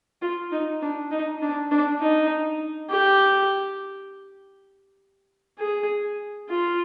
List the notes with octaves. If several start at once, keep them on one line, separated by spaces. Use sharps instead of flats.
F4
D#4
D4
D#4
D4
D4
D#4
G4
G#4
F4